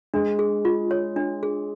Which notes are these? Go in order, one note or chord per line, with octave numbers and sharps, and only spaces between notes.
G#3 D4
G#4
F4
C#5
D4
G#4